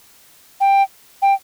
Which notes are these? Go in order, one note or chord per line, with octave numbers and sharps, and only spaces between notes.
G5
G5